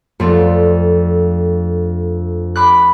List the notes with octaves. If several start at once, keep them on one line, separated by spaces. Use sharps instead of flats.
F2 A3 C4 D4
B5 D6 F#6